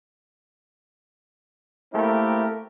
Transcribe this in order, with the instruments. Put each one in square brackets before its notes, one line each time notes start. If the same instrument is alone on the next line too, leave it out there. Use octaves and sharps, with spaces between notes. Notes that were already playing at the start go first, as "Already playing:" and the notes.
[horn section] A3 A#3 C4 E4 G4 A#4